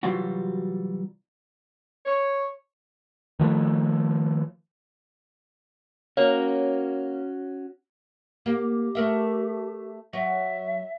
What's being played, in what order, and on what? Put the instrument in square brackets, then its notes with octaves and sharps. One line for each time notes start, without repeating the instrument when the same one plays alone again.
[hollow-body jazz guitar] C3 E3 F#3 G3 F4 F#4
[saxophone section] C#5
[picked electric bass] D#3 F3 G3 A3
[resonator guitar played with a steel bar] A#3 [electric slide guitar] C#4 F#4 [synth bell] C#5
[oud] A#3 [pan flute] G4
[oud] A3 A#4 E5
[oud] F#3 [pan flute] E5